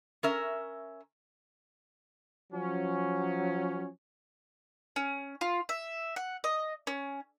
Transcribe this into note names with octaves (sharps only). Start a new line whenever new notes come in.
C#4 A#4 E5
F3 F#3 C#4
C#4
F4
E5
F#5
D#5
C#4